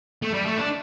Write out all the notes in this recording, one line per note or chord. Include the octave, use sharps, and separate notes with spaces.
A3
G3
A3
D4